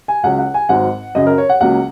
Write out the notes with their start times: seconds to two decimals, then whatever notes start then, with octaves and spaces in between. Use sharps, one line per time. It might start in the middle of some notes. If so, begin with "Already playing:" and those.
0.08 G#5
0.24 C#2 C#3 F#3 C#4 F#5
0.39 F#5
0.54 G#5
0.69 G#1 G#2 F#3 F#5
1.15 F#2 C#3 F#3 D#5
1.27 A#4
1.38 C#5
1.49 F#5
1.61 C#2 C#3 F#3 A#3 F#5